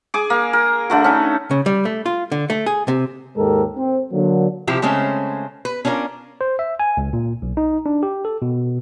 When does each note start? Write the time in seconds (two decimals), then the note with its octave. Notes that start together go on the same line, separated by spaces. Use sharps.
0.14 G#4 D6
0.30 A#3
0.53 A#4
0.90 D3 A3 F#4
1.04 C#4 D#4
1.51 C#3
1.66 G3
1.85 A3
2.06 F4
2.32 D3
2.50 A3
2.66 G#4
2.88 C3
3.36 D#2 G#2 G#3 G4 A4 A#4
3.77 C4
4.12 D3 F#3 A#3
4.67 C3 F3 E4 G4
4.82 C#3 G#3 A3 C4 C#4
5.65 B4
5.85 C#4 D4 F4 G#4 A#4
6.41 C5
6.59 E5
6.80 G#5
6.97 C#2
7.13 A#2
7.42 B1
7.57 D#4
7.86 D4
8.03 G4
8.25 A4
8.42 B2